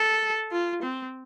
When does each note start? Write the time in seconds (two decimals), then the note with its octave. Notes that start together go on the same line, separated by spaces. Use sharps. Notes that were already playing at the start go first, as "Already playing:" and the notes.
Already playing: A4
0.52 F4
0.83 C4